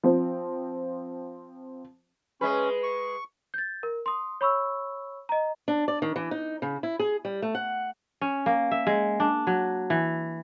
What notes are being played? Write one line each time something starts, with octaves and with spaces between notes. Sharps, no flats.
F3 C4
G#3 C#4 B4
C#6
G6 A6
A#4
C6 D#6
C#5 B5 C#6 E6
D#5 A#5
D4
D5
D#3
E3
D#4
C#3
E4
G#4
G3
A3
F#5
C#4
A#3
E5
G#3
D4
F#3
E3